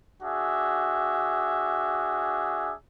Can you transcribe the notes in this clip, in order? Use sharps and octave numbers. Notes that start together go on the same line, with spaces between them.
D4 F#4 G#4 E5